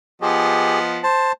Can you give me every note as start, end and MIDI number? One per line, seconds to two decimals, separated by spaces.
0.22 1.00 53
0.22 1.00 59
0.22 0.79 67
0.22 0.79 68
0.22 1.00 75
1.03 1.32 72
1.03 1.32 81